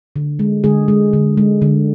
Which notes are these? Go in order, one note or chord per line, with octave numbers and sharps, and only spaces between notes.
D3
G#3
D3 G#3 G#4
G#3
D3
G#3
D3